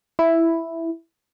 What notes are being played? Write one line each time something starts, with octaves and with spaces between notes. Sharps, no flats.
E4